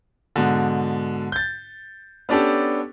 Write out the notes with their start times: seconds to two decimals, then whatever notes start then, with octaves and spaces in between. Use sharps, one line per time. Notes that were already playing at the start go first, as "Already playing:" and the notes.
0.36 G#2 B2 D3
1.32 G6 A6
2.29 B3 C#4 D4 G4 A4